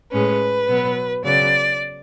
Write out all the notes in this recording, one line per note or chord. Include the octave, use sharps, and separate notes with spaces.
A2 G#3 C#4 B4
B2 F#3 B3
C#3 F#3 B3 D5